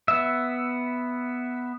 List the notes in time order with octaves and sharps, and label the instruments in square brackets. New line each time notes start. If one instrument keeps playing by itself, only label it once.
[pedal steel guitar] B3 E5